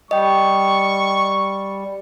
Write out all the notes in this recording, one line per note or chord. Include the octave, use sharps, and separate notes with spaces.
G3 D#5 G5 C#6